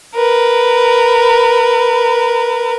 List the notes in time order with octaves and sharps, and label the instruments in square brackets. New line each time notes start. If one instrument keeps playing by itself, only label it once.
[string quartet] A#4 B4